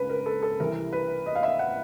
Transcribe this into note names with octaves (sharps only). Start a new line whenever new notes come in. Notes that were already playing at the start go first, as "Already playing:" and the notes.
Already playing: C#2 C#3 B4
A#4
A4
A4
C2 C3 E3 A#4
B4
D#5
F5
E5
F#5